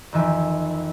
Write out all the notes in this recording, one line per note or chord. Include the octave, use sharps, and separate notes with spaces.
F2 D#3 E3 E5 G#5